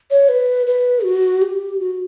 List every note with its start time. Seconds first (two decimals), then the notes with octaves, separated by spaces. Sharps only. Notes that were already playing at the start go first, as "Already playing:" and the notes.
0.11 C#5
0.29 B4
0.67 B4
1.04 F#4
1.42 G4
1.80 F#4